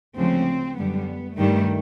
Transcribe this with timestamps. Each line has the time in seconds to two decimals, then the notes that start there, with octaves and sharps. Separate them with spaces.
0.16 D2 C#3 F3 G#3 C4
0.77 F#2 D3 G3 B3
1.37 G2 D#3 G3 A3